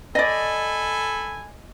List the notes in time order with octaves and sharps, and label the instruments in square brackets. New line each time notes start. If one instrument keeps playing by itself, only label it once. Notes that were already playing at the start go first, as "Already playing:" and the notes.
[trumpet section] A4 G#5 B5 [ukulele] D5 D#5